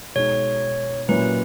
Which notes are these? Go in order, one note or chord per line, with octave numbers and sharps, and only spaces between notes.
B2 G#3 D#4 C#5
A#2 F#3 A#3 C#4 E4 B4